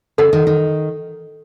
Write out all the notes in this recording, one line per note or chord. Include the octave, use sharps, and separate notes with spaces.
C#3 A4 D#5 F#5
D#3
D#3